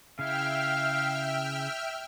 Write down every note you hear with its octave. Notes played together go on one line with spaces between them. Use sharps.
C#3 E4 E5 F5 G5 F6